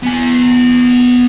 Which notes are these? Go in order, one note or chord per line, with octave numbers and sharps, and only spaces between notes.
B3 G#5